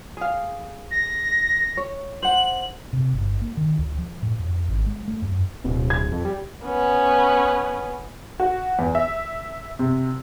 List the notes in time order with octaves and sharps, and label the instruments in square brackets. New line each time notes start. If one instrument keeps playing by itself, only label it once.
[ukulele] G#4 F5
[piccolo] A#6
[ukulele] C#5
[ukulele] C5 F#5 [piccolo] F#7
[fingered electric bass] C3
G1
A#3
D#3
C#2
F3
A2
F2
G#1
G#3
A3
F#2
[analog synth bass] D1 [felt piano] B2
[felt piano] G#6
[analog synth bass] F2
G3
[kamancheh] B3 C#4
[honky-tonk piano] F#4
E2
E5
C3